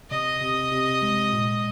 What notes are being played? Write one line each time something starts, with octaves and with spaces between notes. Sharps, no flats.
C3 D#5
C3
C3
G#3
A#2